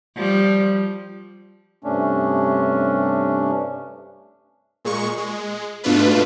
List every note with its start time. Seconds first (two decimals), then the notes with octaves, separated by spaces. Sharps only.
0.17 F3 G3
1.84 G2 C3 A3 C#4 D4
4.85 A#2 G#3 C#6
5.18 G#3
5.84 G#2 B2 A3 D4 F4 B4